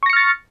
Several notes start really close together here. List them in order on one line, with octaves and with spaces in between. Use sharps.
C#6 A#6 C#7 F6 A6